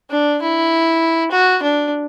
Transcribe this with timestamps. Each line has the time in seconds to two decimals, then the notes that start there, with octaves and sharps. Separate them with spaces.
0.11 D4
0.42 E4
1.31 F#4
1.63 D4